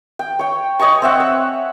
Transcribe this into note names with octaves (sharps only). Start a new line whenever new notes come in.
G5
C#5 G5
C#5 D#5 G#5 C#6
C4 E5 F#5
C#5